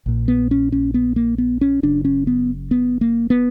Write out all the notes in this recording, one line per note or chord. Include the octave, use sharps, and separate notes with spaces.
A#1 A#2
B3
C#4
C#4
B3
A#3
B3
C#4
F#1 F#2 C#3 D4
C#4
B3
B3
A#3
B3